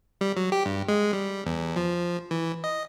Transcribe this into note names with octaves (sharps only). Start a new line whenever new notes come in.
G3
F#3
G4
G2
G#3
G3
E2
F3
E3
D#5